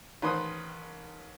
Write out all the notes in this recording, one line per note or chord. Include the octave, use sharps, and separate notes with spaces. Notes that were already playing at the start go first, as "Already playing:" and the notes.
A1 D#3 B4 C5 C6 D#6